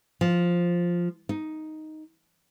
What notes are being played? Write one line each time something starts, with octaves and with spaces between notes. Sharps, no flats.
F3
D#4